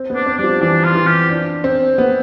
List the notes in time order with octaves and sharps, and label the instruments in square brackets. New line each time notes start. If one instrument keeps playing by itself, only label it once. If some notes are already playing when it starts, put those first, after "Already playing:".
Already playing: [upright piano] C4
B3
[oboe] D4
[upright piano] C4
[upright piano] G3 [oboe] D4
[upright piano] F3
[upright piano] E3 [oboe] D4
[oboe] F4
[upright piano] E3
[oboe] G4
[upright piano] D4
C4
B3